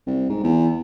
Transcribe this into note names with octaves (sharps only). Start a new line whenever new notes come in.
C2
G#2
E2